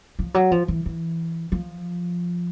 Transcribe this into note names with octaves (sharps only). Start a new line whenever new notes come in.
F3
F#3
F3
E3
E3
F3